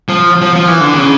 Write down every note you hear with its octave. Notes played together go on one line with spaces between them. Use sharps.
F3
F3
F3
E3
D3
C#3